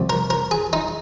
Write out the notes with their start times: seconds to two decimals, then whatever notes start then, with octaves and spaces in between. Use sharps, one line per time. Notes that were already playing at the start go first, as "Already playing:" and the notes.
Already playing: C2 C3 F3
0.10 A#4
0.30 A#4
0.51 G#4
0.73 D#4